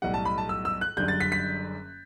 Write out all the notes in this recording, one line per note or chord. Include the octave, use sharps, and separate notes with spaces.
B1 A2 G3 F#5
A5
B5
A5
E6
E6
F#6
F#1 F#2 D3 G3 G6
A6
B6
B6